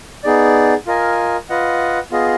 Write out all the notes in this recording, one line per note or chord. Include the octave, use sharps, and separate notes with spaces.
B3 D#4 G#4 D5
F4 A#4 D#5 G#5
F4 B4 D#5 F#5
B3 F4 G#4 D#5